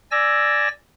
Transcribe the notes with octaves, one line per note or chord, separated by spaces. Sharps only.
D5 G#5 E6 A#6